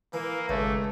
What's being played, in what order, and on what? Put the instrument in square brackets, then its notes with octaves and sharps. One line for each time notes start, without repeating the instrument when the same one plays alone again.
[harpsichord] E3 [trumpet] A#3
[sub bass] G#1 [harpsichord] C#2 [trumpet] A3